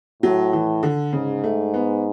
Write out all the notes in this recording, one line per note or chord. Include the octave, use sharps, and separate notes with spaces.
A2 F#3
E3
D3
G#2 C#3
A3
B3